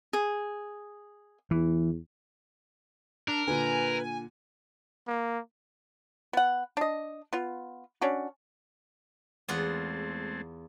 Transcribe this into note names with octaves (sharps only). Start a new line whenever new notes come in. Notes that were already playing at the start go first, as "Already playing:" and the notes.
G#4
E2 E3
D4 A#4
A#2 D3 B4 G#5
A#3
B3 F#5
D4 D#5
B3 F4
C#4 D4 F#4
E2 G#3 A3 C4 F4 F#5